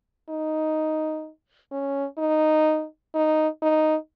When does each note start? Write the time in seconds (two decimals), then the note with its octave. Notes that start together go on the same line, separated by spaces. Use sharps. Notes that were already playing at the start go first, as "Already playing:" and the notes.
0.29 D#4
1.72 C#4
2.18 D#4
3.15 D#4
3.62 D#4